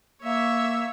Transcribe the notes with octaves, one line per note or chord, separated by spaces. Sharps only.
A#3 C#5 E5